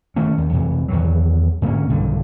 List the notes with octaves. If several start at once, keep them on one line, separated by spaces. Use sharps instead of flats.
D#3 A3 C#4
D#2 D#3
F2 C3 E3
E2 D#3 E3 F#3
G#2 D3 A#3 C#4
B1 G2 D3 D#3